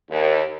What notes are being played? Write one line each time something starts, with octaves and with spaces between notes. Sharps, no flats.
D#2